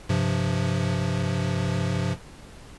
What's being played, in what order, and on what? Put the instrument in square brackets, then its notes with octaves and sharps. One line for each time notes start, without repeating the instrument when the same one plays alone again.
[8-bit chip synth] G2 C3 F3